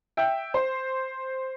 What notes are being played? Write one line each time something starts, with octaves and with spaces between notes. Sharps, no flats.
E5 G5
C5